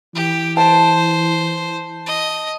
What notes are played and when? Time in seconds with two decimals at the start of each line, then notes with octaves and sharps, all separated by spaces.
0.15 E3 G4
0.57 C5 A5
2.06 D#5